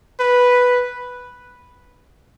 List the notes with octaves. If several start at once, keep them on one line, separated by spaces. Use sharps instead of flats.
B4